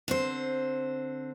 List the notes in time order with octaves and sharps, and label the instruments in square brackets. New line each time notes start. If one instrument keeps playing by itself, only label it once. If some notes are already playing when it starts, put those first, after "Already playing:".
[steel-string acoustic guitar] D3 C4 C5